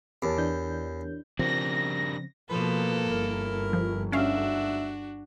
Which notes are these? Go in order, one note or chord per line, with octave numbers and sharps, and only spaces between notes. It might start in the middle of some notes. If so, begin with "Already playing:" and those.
E2 G4 A#4 C#5 A5 D6
E3 D4 G6
C#3 F3 C4 D4 G4 A#4 A#6
B2 F3 A#3 A4 B4
G1 E4 A#4
F3
D2 G#2 C#4 D4 F#4 E5 F5